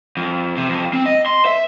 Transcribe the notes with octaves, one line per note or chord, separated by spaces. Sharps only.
F2
C3
F2
C4
D#5
C6
E5